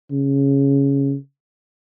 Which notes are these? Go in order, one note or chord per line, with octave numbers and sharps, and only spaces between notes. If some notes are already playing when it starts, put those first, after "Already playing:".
C#3